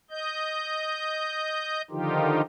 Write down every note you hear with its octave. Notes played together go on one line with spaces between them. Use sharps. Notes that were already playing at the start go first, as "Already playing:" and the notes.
D#5 G6
D3 D#3 F3 D#4 F4 G4